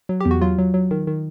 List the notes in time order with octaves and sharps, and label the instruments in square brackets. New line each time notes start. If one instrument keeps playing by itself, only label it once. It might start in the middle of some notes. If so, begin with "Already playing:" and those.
[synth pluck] F#3
E2 G4
F#4
F#3 F4
F#3
F#3
D#3
D#3